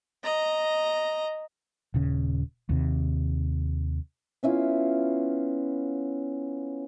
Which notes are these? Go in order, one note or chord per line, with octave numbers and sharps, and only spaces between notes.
D#5 A#5
D#1 C#3
D#2 C3
B3 C#4 E4 F4